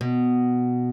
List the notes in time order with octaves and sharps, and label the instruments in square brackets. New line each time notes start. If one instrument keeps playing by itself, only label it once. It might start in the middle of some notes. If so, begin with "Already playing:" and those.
[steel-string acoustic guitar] B2